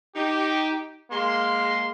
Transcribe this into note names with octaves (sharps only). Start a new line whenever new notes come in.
D#4 G4
G#3 A#3 C6